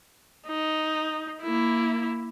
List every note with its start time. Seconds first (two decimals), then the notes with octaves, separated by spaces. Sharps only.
0.47 D#4
1.42 A#3 E4